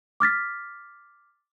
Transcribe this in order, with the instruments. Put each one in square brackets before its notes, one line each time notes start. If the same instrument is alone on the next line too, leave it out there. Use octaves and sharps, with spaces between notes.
[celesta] D6 F6 A6 B6